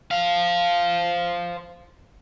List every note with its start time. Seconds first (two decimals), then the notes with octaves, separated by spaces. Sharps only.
0.11 C5 F5